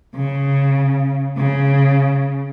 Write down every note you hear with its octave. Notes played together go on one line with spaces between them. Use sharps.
C#3
C#3